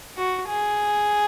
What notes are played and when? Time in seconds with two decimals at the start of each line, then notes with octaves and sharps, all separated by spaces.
0.17 F#4
0.48 G#4